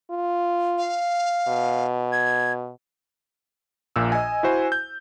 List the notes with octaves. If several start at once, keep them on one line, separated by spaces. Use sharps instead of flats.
F4
F5
B2
G#6
A#1 A#2 E6
D#5 G#5
E4 F#4 C5 G#5
G6